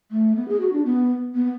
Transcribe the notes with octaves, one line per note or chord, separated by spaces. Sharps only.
A3
B3
G#4
F#4
D4
B3
B3